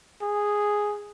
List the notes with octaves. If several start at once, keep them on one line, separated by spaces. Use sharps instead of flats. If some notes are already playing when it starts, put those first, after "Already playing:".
G#4